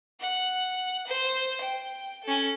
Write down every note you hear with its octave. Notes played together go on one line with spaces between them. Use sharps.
F#5
C5
G5
C#4 A4